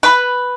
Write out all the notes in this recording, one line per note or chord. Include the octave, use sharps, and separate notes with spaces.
B4